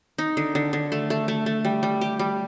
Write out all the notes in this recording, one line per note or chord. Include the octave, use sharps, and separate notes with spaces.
D#4
D3
D3
D3
A3
A3
A3
A3
G3
G3
G4
G3